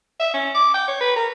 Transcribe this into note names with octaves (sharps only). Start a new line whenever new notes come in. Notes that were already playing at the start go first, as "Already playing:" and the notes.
E5
C#4
D6
G5
C#5
B4
A#4